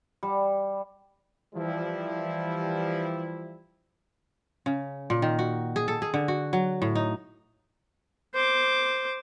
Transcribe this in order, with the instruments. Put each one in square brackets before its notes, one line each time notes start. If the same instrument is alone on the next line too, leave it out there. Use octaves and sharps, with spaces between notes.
[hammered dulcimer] G3
[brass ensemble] E3 F3 G3 E4
[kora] C#3
A#2
D#3
F#4
G#4
A4
G#4
D3
F#4
F#3
A2
D#4
[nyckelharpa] C5 D6